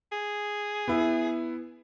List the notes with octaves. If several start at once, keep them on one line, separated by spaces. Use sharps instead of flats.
G#4
B3 E4